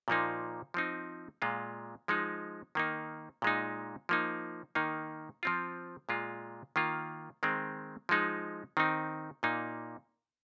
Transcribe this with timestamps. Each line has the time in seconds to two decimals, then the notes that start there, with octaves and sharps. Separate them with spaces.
0.08 A#2 F3 A#3 D#4
0.74 F3 C4 D#4
1.42 A#2 G#3 F4
2.08 F3 G#3 D#4
2.75 D#3 A#3 D#4
3.42 A#2 G#3 D#4
4.09 F3 A#3 D#4
4.75 D#3 A#3 D#4
5.43 F3 C4 F4
6.09 A#2 G#3 F4
6.76 D#3 A#3 F4
7.43 D#3 G#3 C4
8.09 F3 G#3 D#4
8.77 D#3 C4 D#4
9.43 A#2 A#3 D#4